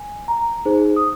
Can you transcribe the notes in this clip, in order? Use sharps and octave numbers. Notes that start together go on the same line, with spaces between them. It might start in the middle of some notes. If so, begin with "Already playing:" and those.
Already playing: G#5
A#5
D#4 G#4 C5
D#6